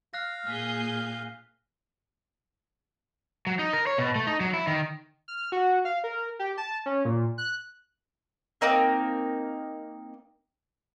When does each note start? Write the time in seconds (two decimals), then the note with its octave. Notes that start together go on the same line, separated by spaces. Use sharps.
0.14 F5 F6 F#6 A#6
0.47 A#2 G#4 F6 G6 B6
3.47 F#3
3.59 D#4
3.73 A#4
3.87 C#5
3.98 B2
4.15 A3
4.27 D#4
4.40 F#3
4.53 E4
4.67 D#3
5.28 F6
5.52 F#4
5.85 F5
6.04 A#4
6.39 G4
6.58 A5
6.86 C#4
7.05 A#2
7.38 F#6
8.61 A#3 C4 D#4 A#4